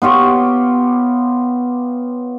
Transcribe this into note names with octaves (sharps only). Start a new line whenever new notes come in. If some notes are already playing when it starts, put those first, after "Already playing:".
B3 F4 G4 C#5